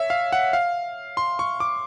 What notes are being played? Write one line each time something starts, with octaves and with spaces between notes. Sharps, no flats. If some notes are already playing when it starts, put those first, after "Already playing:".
Already playing: C#5 E5
F5
F#5
F5
C6
C#6
D6